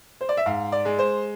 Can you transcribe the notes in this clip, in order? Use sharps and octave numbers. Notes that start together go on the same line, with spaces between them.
C5
D5
E5
G#2 F5
D5
G#3
C5